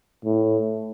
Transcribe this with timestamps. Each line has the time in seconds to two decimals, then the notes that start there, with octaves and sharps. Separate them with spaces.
0.25 A2